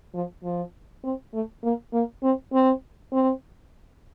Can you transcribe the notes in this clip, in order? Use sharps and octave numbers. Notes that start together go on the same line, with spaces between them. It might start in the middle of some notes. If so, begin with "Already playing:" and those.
F3
F3
C4
A3
A#3
A#3
C4
C4
C4